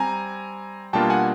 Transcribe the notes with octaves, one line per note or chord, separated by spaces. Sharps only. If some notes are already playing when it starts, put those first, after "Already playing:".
Already playing: G3 C4 G#5 A#5
B2 G3 A#3 D4 F4 G5 A5
F#5 G#5